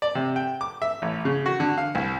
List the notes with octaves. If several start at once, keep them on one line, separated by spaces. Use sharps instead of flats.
D5
C3
G5
D6
E5
A1
C#3
F#4
D3
F5
C2